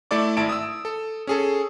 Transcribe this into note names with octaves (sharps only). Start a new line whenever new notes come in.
A3 E4 A4 D5 D6
G#1 E4 A5 D7
D#6 E6
A4
C#4 G#4 A4